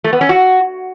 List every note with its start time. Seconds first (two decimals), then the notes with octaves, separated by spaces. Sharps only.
0.04 A3
0.13 B3
0.21 C#4
0.29 F#4